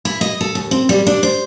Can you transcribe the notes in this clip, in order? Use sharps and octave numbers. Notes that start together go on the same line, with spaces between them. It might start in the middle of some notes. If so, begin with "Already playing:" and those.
E4
D#5
A4
D#2
C4
G3
D4
C5